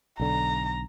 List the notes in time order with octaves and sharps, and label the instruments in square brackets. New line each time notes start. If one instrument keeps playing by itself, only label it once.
[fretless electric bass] B1 D3 [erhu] A#5